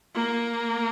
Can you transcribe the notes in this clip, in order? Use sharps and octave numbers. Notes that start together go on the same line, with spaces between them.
A#3